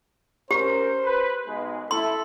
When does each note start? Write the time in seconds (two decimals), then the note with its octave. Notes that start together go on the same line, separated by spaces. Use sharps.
0.51 C#4 G4 A#4 C5
1.03 B4
1.46 B1 G#3
1.91 E4 A4 C6